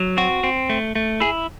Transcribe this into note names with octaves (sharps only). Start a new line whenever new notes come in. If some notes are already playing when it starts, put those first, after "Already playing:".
Already playing: F#3
C4 F#4
C4
A3
A3
E4 G#4